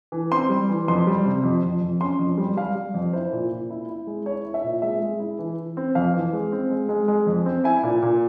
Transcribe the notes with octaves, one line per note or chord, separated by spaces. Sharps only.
E3
C4 C6
G3
E3
F2 C6
G3
C3
F2
F2
F2
C#4 C6
F2
G3
G3 F5
G3
F2
E4 C5
A#2
A#2
E4
E4
G#3
E4 C#5
E4
E5
A#2
G#3 E5
G#3
E4
E3
E3
C4
F2 F5
E3
G#3
C4
G#3
G#3
G#3
F2
C4
E4 G#5
A#2
A#2